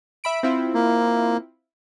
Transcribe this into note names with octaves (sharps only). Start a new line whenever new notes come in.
E5 B5 D7
C4 E4 F4
A#3